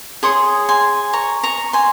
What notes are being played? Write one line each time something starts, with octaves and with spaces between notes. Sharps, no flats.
G#4 C#5 C6 D#6
G#5 C6
A#5 C#6
A#5 C#6
G#5 C6